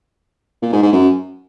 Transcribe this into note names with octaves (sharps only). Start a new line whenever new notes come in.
A#2
G#2
G#2
F#2